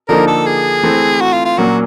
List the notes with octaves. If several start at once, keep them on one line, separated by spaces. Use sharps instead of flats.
D3 F3 A#3 D#4 A#4
A4
G#4
E3 A3 C4
F#4
F4
F4
A#2 F#3 A#3 C#4 F#4